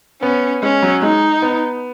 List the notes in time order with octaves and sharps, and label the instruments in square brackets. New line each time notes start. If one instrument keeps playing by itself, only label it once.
[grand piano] B3 [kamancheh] C#4
[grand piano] G#3 [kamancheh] C#4
[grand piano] F#3
[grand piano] G#3 [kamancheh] D#4
[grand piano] B3